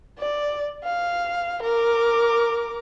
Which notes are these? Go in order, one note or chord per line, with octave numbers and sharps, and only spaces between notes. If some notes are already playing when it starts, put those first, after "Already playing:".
D5
F5
A#4 D6